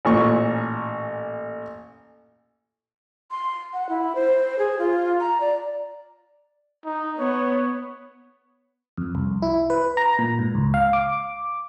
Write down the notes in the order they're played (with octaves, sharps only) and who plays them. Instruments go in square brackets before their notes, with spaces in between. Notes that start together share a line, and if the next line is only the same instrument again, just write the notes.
[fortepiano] A1 A#2 C#6
[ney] C6
F#5
E4
C5
G#4
F4
A#5
D5
[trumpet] D#4
[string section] B3 [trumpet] C#5
[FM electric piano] F2
C2
E4
B4
A#5
A#2
G#2
C#2
F5
D6